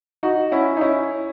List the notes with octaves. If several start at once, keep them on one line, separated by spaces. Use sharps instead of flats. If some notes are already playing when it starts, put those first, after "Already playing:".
D#4 F#4
C#4 E4
D#4
C#4 E4